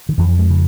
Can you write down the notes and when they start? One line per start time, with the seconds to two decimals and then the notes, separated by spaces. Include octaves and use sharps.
0.09 D#3
0.18 F2 E3
0.39 G#3
0.50 C#3